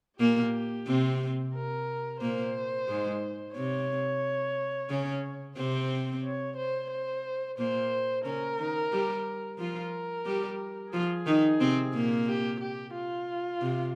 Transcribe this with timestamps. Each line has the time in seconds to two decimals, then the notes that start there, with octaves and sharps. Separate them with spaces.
0.20 A#2 A#3 G4
0.87 C3 C4
1.55 A#4
2.21 A#2 A#3 C5
2.88 G#2 G#3
3.56 C3 C4 C#5
4.90 C#3 C#4
5.56 C3 C4 C5
6.23 C#5
6.57 C5
6.91 C5
7.58 A#2 A#3 C5
8.25 C#3 C#4 A#4
8.58 D#3 D#4
8.92 G3 G4
9.59 F3 F4 A#4
10.26 G3 G4
10.93 F3 F4 G#4
11.26 D#3 D#4
11.61 C3 C4
11.94 A#2 A#3
12.28 G4
12.60 G4
12.94 F4
13.62 C3